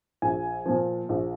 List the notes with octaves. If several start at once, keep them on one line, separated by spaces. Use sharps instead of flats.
A#1 G#5
A#2 F3
A#1